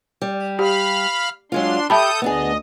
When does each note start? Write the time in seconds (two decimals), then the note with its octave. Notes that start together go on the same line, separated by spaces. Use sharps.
0.22 G3
0.59 G4 F5 B5 F6
1.52 F#3 G#3 D4 F4 C6
1.90 G4 A4 E5 A5 B5 D#6 G6
2.22 D2 B3 D4 G#4 D#5